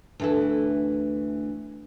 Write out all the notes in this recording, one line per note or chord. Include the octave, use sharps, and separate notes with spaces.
D2 E3 A4